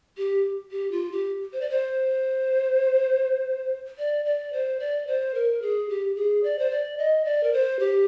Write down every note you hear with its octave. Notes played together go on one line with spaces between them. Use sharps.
G4
G4
F4
G4
C5
D5
C5
D5
D5
C5
D5
C5
A#4
G#4
G4
G#4
D5
C5
D5
D#5
D5
A#4
C5
G4